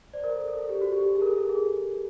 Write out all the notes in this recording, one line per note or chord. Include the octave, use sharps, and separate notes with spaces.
C5 D5
A#4
A4
A4
A4
G4
F#4
G4
G4
G#4
A#4
A4
A4
G#4